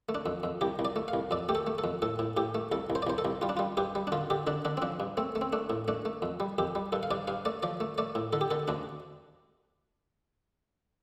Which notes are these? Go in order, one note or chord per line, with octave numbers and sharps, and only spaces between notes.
A3
D4
F2
F2
C2 G4
C2
D5
A3
F5
C2
F2 D5
A3 G4
A4
A3
A4
F2
A2 A4
A2
A2 G4
A3
C2 A4
C2
C5
D5
C2 C5
A4
C2
G3 F4
D4
G3 F4
G2 G4
G3
D4
D3 F4
D3 G4
D3 D4
D3 D4
C4
F3 D4
G2
A3 C4
A3
C4
A3 D4
A2
A3 D4
A3
F2
G3
F2 G4
G3
G2 A4
F5
G2 D5
G2 F5
A3 D5
F3 D5
A3
A3 D5
A2
D3 A4
G4
D3 A4
D2 D4